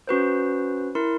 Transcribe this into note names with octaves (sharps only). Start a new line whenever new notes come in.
C#4 F#4 B4 C5
E4 A#4 C6